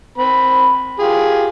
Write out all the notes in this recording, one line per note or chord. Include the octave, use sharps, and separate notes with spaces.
C4 B5
F4 G4 G#4